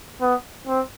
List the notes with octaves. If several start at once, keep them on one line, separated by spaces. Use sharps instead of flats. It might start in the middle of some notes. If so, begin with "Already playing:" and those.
B3
C4